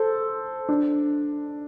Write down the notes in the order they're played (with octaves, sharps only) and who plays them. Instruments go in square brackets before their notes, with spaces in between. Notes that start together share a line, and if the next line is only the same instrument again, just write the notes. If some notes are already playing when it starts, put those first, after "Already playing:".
Already playing: [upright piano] A4 C5
D4